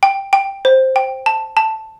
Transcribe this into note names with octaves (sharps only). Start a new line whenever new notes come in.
G5
G5
C5
G5
A5
A5